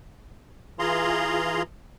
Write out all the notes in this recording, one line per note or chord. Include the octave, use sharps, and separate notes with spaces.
E3 F4 G#4 A#5 C6